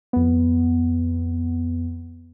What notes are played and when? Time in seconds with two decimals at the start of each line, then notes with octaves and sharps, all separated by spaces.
0.13 F2 B3